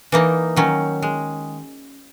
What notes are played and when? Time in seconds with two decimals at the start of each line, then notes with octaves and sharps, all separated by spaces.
0.12 E3 A#3 D#4
0.56 D#3 F#3 C#4
1.02 G#3